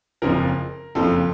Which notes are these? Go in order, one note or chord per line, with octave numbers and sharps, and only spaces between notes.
F#1 F2 C#3 F3 A#4
F#1 F2 C#3 F3 A4